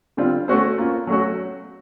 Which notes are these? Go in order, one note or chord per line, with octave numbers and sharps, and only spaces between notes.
D3 G3 C4 F4
A3 C#4 F#4 A4 C5
A#3 C#4 F4
F#3 A3 C#4 F#4